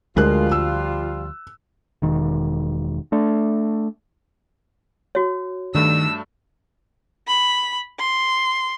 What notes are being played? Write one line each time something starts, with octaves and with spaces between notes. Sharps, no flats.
D2 F3 G3 G#3 F4 A#4 F#6
E6
E1 D#3
A3 D4
F#4 C#5
G2 D#3 A3 D4 E6
B5
C6